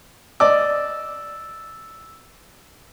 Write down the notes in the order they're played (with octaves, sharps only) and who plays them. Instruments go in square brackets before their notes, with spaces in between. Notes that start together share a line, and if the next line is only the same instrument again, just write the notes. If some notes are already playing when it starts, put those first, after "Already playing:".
[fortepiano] D5 D#5 D6 [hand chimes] E6